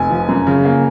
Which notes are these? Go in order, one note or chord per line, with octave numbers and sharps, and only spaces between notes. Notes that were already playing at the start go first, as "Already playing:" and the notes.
Already playing: F1 G#5
F3
F#2
C#3
A#3